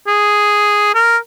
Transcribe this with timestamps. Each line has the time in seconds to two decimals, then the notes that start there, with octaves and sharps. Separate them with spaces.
0.07 G#4
0.95 A#4